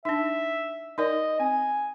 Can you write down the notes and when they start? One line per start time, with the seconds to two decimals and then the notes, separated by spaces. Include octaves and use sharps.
0.05 D4 D#4 E5
0.98 D#4 A#4 D5 D#5
1.40 C4 G#5